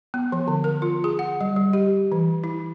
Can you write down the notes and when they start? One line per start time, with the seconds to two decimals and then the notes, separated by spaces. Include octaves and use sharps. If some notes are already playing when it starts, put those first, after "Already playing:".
0.14 B3
0.32 F3
0.48 D3
0.64 A#4
0.82 F4
1.04 G#4
1.19 F#5
1.41 G3
1.56 G3
1.73 G4
2.12 E3
2.44 E4